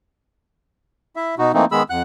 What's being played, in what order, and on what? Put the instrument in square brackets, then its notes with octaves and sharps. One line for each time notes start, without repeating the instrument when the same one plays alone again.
[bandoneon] E4 E5
B2 D#4 F#4
E3 A3 A#3 C4 D#4
D#3 G#3 B3 G#4 B5 E6
F2 F#5 F#6